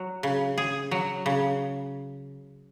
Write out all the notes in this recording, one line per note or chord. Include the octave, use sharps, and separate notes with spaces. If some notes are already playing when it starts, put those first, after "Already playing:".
Already playing: F#3
C#3
G#4
F#3
C#3